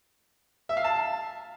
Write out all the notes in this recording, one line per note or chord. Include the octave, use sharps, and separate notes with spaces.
E5
F5
A5